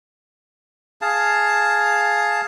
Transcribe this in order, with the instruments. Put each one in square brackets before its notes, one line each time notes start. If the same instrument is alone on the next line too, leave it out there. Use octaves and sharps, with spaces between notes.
[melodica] G#4 F5 A5